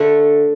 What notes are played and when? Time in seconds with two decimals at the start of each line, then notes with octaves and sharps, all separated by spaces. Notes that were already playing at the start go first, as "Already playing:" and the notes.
Already playing: D3 A3 E5